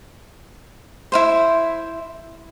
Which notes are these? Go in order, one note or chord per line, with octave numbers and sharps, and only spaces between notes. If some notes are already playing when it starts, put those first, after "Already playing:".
E4 F4 C5